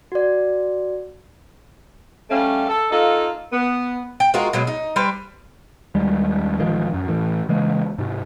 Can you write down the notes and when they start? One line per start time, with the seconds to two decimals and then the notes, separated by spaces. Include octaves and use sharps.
0.12 F#4 D5
2.30 G3 A3 C#4 F5
2.69 A4
2.91 A#3 D#4 F4 A4
3.52 B3
4.20 G5
4.34 G#3 F4 F#4 A#4
4.53 B2 F#3 G#3
4.67 D#4
4.96 G3 D4 B4 C5
5.95 D#2 G3 G#3
6.59 A1 D#3 F3 G#3
6.94 F#2
7.08 A2 E3
7.49 C#3 E3 G#3 A#3
7.98 G#2 C3